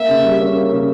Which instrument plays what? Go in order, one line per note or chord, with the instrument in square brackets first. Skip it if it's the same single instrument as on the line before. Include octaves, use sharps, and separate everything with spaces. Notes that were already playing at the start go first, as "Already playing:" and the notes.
Already playing: [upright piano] A#3 [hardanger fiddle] E5
[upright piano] C#3
G3
C#4
A#3
C#3